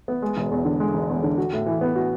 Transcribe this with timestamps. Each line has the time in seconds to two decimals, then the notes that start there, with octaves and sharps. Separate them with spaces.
0.08 B3
0.22 G#3
0.37 E1
0.52 E2
0.65 D3
0.80 G#3
0.94 E1
1.09 E2
1.23 D3
1.38 F#4
1.53 A2
1.66 E3
1.81 B3
1.96 F#4